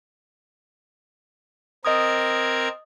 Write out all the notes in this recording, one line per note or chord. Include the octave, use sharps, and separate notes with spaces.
C4 A#4 D#5 D#6 G#6